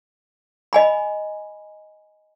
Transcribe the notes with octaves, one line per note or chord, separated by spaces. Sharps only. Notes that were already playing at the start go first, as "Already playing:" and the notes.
D#5 G#5 B5